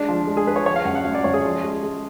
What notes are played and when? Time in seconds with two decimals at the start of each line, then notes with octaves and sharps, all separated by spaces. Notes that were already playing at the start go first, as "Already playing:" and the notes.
Already playing: G#3 D4
0.08 F3
0.27 G#3
0.37 G#4
0.46 G#3 B4
0.56 C#5
0.66 F3 C#5
0.76 F5
0.85 F#2 F#5
0.95 F#5
1.05 F#2 F5
1.15 D5
1.24 F#2 C#5
1.34 G#4
1.44 F3
1.64 G#3
1.83 G#3